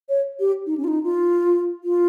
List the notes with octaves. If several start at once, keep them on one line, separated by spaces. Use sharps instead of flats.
C#5
G4
D#4
C#4
F4
D#4
F4
F4